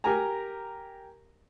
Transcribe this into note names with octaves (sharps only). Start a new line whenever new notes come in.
G4 A#4 G#5 A#5